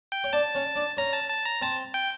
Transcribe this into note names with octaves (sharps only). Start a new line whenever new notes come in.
G5
C#5
D4 D5 A5
C#4 C#5
D4 D5
C#4 C#5 A#5
A5
A5
A#5
C4 C5 A5
G5